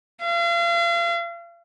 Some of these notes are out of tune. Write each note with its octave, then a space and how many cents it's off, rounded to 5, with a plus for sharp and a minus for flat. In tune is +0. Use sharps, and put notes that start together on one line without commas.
F5 -40